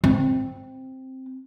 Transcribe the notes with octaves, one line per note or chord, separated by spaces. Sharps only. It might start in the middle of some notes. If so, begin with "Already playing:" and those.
C4